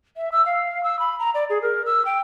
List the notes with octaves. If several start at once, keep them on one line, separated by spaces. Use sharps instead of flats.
E5
E6
F5
E6
B5
A#5
D5
G#4
A#4
E6
G5